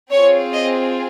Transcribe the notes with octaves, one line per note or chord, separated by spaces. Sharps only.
C4 F4 G#4 C#5
D#5